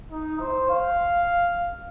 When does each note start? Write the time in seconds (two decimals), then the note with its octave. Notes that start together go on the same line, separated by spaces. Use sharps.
0.11 D#4
0.40 C5
0.69 F5